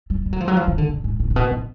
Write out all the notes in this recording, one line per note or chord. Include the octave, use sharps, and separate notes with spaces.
G3
G3
F#3
F3
F#3
F3
D#3
D3
C#3
G#2
A#2
A#2
B2
C3